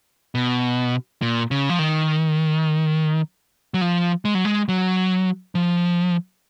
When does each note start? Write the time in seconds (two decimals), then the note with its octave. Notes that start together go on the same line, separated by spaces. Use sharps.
0.35 B2
1.22 A#2
1.51 C#3
1.69 F3
1.79 D#3
3.74 F#3
3.81 F3
4.25 G#3
4.35 F#3
4.45 G#3
4.68 F#3
5.55 F3